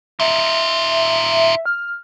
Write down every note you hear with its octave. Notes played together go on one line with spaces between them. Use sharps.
D#4 F4 E5
F6